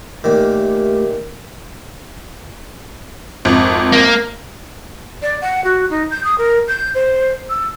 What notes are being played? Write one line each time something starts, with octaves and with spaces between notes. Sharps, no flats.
A#2 D#3 A3 G4
G#1 F2
A#3
D5
F#5
F#4
D#4
G6
D#6
A#4
G6
C5
E6